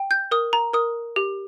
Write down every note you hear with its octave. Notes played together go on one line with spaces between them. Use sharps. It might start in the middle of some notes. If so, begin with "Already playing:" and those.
Already playing: G5
G6
A#4 D#6
A#5
A#4 D#6
G4